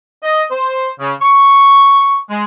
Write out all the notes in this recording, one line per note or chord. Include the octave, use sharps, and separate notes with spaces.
D#5
C5
C#3
C#6
G#3